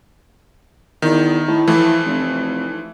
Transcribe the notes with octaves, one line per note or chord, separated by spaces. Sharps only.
E2 D#3
A2
E3 F3 A3
F1